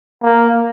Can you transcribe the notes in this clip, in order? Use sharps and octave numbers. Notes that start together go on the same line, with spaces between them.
A#3